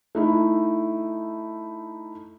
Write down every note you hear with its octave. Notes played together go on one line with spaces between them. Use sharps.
A3 D#4 E4